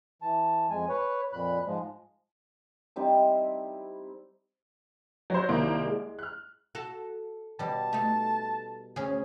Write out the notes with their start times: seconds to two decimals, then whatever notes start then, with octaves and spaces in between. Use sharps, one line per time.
0.22 E3 A5
0.70 F2 G#3 G#5
0.89 B4 C#5
1.33 F2 A#2 B5 F#6
1.66 G#2 F3 G#3
2.96 G3 C4 D#4 E4
5.30 F#3 C5
5.49 C2 D#3 A#3 C5
5.86 G#3
6.19 F6 F#6
6.75 F#4 A4
7.59 B2 G3 A5
7.93 A3 D#4
8.96 D2 C#4 G#4